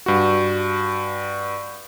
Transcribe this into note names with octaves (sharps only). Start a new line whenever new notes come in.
G2 F#4